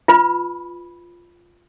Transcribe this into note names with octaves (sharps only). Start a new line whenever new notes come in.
F4 B4 B5